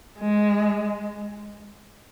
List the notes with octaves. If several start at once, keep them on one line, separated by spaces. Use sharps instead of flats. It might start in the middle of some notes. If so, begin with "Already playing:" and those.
G#3